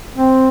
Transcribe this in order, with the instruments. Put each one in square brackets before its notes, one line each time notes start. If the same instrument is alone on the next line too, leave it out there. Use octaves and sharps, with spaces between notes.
[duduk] C4